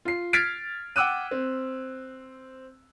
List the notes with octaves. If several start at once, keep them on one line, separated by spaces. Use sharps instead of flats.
F4 C7
F6 G#6 A6 B6 C7 D7
F#5 G5 D6 E6 F#6 D#7
C4